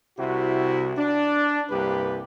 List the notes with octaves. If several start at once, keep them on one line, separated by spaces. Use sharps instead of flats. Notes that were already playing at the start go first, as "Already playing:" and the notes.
C2 C3 E4 F#4
D4
C2 G2 A#3 G4 B4